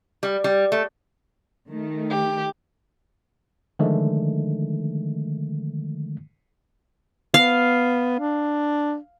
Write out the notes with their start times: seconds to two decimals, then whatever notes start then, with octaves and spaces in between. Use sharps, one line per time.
0.23 G3
0.44 G3
0.72 A3
1.67 D#3 A3
2.10 G4
3.79 D3 D#3 F3 G#3 A3
7.34 B3 F5
8.20 D4